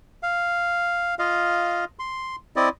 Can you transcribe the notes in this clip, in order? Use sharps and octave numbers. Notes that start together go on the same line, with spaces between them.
F5
F4 D#5 F5
C6
C4 E4 D5 D#5